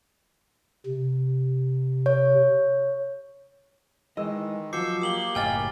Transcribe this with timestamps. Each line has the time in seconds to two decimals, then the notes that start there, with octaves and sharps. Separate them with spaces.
0.87 C3
2.06 C#5
4.17 D#3 E3 G#3 D#5 E6
4.73 F3 F#3 D6 E6 G6 C7 C#7
5.02 A#3 G4 D#6 F#7 G7
5.35 F#1 A2 C#5 D#5 G5 G#5 F6 A6